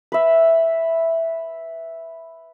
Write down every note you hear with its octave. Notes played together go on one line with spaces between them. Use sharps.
B4 E5